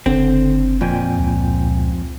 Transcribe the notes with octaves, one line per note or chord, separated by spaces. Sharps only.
F#1 D3 C4
F2 A#2 G5 G#5
C#2